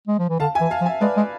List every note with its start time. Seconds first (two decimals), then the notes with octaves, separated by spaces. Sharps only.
0.07 G#3
0.19 F3
0.29 E3
0.40 D3 F5 A5
0.55 E5 G#5
0.61 E3
0.71 F5 A5
0.81 F3
0.86 E5 G#5
1.01 G#3 B4 D5
1.17 G#3